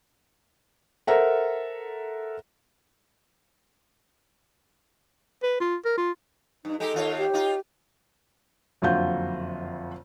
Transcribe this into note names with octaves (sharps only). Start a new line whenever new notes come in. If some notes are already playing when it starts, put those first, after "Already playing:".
A4 A#4 C5 E5 F#5 A#5
B4
F4
A#4
F4
G2 D#4
G#3 D#4 G4 A4
D#2 F4 C#5
G4
D#4 F4
F#1 F2 D3 F4 F#4 G6